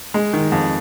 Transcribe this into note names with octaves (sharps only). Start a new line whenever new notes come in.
G#3
D#3
F2